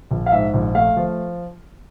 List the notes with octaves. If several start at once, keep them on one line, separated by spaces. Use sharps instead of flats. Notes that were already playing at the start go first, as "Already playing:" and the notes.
A#1
F5
G#2 E5
A#1
A3 F5
F3